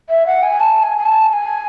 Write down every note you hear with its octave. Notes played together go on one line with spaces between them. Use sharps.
E5
F#5
G#5
A5
G#5
G#5
A5
A5
G#5